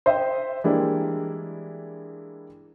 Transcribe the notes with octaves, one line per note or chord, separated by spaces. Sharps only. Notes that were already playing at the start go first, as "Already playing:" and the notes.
C5 D#5 E5 G5 C6
E3 G3 G#3 A#3 D4 E4